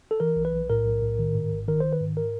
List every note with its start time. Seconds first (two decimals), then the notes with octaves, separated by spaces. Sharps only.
0.11 A4
0.20 E3 A#4
0.36 B1
0.45 B4
0.53 B1
0.70 A2 A#4
0.85 B1
1.02 A2
1.19 D#3
1.35 G#2
1.52 G#1
1.68 D#3 A#4
1.80 D#3 C5
1.93 B4
2.01 G#2
2.17 A#4